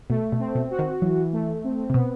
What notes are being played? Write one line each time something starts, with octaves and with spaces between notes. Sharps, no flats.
B2 A3
B2
C4
B2
F#4
D#3
E3 F#3
A3
C4
C3
B2 B3